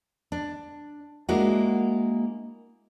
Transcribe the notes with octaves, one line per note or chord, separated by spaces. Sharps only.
D4
G#3 A#3 D4 E4 F#4